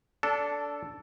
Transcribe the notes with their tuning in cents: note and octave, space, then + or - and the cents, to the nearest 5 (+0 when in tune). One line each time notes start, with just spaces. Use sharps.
D4 -20 A4 +0